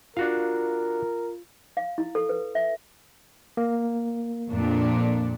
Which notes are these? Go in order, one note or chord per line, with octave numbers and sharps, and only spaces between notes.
D4 F4 F#4 A#4 F5
F5
E4
A4
B4
E5
A#3
F2 A#2 D4